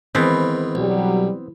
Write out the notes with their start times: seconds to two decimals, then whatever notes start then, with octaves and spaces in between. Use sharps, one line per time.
0.15 G#2 D#3 E3 B3 C4
0.75 B1 F#3 G3